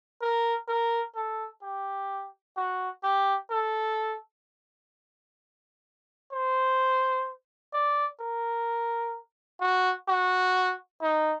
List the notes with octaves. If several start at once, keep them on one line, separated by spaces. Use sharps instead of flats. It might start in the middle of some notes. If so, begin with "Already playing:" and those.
A#4
A#4
A4
G4
F#4
G4
A4
C5
D5
A#4
F#4
F#4
D#4